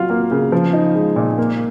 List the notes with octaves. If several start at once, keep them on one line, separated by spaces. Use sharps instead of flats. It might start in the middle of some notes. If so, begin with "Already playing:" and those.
Already playing: F#3 F4
A#3
C#3
F3
D#4
G#3
A#2
A#3